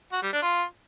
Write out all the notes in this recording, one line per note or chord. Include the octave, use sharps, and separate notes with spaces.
F#4
G3
D4
F4